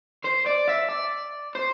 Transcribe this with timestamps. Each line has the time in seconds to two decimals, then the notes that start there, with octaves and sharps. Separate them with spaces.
0.25 C5
0.47 D5
0.69 E5
0.89 D5
1.55 C5